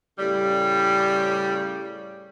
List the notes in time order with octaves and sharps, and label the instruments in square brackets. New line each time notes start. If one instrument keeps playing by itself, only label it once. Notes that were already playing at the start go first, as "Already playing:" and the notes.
[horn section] A2 C#3 G3